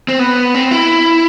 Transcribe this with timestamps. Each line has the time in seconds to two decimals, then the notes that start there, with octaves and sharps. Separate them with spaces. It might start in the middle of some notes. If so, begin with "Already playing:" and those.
0.08 C4
0.19 B3
0.54 C4
0.71 E4